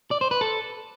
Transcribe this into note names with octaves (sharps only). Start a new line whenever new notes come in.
D5
C5
B4
A4